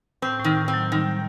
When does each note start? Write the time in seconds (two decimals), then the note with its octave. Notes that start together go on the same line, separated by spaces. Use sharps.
0.22 A2 C4
0.40 A2 D#3
0.57 A2
0.68 C4
0.74 F#3
0.92 D#3 G3